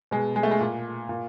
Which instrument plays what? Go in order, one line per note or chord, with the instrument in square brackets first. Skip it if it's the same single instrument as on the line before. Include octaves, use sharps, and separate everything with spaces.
[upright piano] B2 G#3
G#3
A3
G#3
A#2
A#2